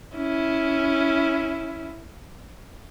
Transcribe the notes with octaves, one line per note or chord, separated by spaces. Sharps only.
C#4 E4